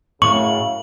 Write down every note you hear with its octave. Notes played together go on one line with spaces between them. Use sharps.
F#2 A2 C#3 C#6 F#7